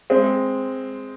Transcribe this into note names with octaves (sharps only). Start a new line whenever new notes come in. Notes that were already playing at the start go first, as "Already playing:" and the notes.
G#3 C4